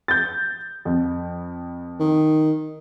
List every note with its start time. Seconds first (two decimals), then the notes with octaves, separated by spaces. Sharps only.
0.08 G6 A6
0.85 F2
2.00 D#3